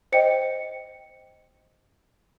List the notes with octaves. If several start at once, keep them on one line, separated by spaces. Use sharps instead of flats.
C5 D#5 G5 C#7